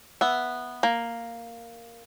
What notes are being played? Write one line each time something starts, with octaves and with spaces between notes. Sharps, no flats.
B3 E5
A#3